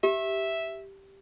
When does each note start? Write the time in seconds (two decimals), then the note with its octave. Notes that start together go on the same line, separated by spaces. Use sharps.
0.03 G4 E5